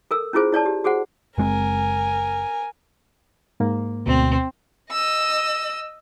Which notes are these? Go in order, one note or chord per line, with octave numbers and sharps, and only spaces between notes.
A4 A#4 E6
C#4 E4 F4 G#4 C5
E4 C#5 D5 A5
G4
F#4 G#4 C5 F#5
F#1 G#3 C4 A#4 G#5
G#2 A#3
D2 B2 C4
D#5 E6